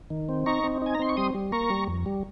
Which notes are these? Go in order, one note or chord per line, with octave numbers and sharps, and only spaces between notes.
D#3
C4
D#4 A#5 C#6
C4
D#4 G#5
A#5
C4 C6
C#6
G3 C6 D#6
G3
A#3 A#5 C#6
G3
F2
G3